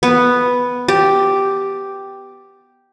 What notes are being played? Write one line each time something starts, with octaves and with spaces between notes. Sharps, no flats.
B3
G4